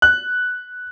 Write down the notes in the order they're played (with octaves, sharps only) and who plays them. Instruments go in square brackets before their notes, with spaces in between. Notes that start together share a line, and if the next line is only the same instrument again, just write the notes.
[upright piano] F#6